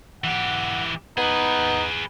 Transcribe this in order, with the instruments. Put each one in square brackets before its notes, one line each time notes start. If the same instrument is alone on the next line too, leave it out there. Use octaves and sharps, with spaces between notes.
[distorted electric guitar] E3 G4 [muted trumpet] F#5
[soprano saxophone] B3 [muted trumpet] D#4 [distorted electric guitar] G#4 B4